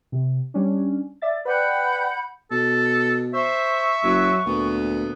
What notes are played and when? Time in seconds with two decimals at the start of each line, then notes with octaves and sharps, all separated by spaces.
0.12 C3
0.54 G3 C#4 D4
1.22 D5 E5 A6
1.45 B4 D5 F#5 G5 B5 G6
2.51 B2 A4
3.34 C5 E5 C#6
4.03 F#1 F#3
4.46 D2 A#2 B3